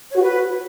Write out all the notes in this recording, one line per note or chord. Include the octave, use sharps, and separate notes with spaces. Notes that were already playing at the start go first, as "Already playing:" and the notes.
C#5
F#4
B4